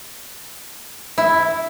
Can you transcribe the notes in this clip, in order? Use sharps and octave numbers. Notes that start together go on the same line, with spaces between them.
E4